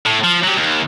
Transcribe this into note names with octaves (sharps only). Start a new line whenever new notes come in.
A2
F3
F#3 G4
D#2